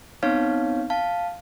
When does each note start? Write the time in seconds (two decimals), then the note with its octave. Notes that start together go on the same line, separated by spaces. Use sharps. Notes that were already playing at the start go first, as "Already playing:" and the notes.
0.23 B3 C4 D#4 C#5 F5
0.90 F5 A5